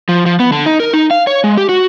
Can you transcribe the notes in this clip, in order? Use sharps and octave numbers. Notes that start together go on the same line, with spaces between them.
F3
F3
B3
D3
D#4
A#4
D#4
F5
C#5
G#3
G4
F#4